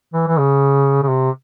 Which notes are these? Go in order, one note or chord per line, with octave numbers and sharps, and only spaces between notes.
E3
E3
C#3
C#3
C3